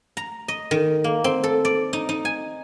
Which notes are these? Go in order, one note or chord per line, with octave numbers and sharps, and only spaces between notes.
A#5
D#5
D#3
A#3
C4
A4
D5
D#4
D#4
G#5